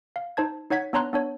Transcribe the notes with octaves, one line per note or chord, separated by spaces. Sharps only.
F5
D#4 C5 A5 G#6
D#4 C#5 F#5 G#6 B6
B3 D4 C#5 A#5 C6 F#6
B3 D4 C#5